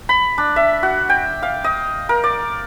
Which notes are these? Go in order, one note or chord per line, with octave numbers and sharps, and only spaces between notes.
B5
D4
E5
F#4
G5
F5
D#5
A#4
D5